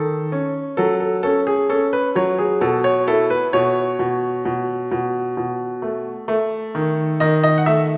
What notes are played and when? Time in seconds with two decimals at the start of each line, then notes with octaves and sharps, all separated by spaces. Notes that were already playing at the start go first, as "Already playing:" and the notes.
Already playing: D#3 A4
0.32 C#4
0.77 F#3 A4
1.00 A4
1.23 C#4 A4
1.47 G#4
1.69 C#4 A4
1.93 B4
2.15 F#3 C#5
2.38 G#4
2.61 B2 A4
2.84 C#5
3.07 E4 A4
3.30 B4
3.53 B2 C#5
3.99 B2
4.45 B2
4.91 B2
5.37 B2
5.82 A3
6.28 A3
6.75 D#3
7.20 D#3 D#5
7.44 D#5
7.58 F#5
7.66 A3 E5